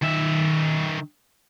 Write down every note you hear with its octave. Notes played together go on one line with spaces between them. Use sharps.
D#3 E5